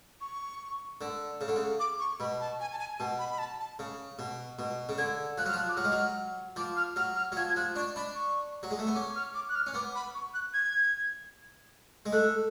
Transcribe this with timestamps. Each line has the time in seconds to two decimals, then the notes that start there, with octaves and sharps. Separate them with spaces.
0.21 C#6
1.01 D3
1.41 C#3
1.48 D3
1.56 C#3
1.80 D6
2.00 C#6
2.20 B2 B5
2.40 A5
2.60 G#5
2.73 A5
2.79 G#5
2.99 B2 A5
3.19 B5
3.31 B5
3.39 A5
3.59 A5
3.79 C#3
4.19 B2
4.59 B2
4.89 C#3
4.98 D3 G#6
5.38 F3 F#6
5.46 F#3 F6
5.53 F3
5.58 F#6
5.69 D6
5.77 F#3 F6
5.84 G#3
5.92 F#3
6.56 F3 D6
6.76 F6
6.96 F#3 F6
7.16 F6
7.32 F#3
7.36 F3 G#6
7.49 G#6
7.56 F3 F#6
7.76 D4 C#6
7.96 D4 B5
8.15 C#6
8.63 F#3
8.71 G#3
8.79 A3
8.87 B3
8.95 C#4 D6
9.16 F6
9.35 D6
9.49 F#6
9.55 F6
9.67 C#4
9.74 B3 D6
9.95 B5
10.15 C#6
10.34 F#6
10.54 G#6
12.06 G#3
12.12 A3 F#6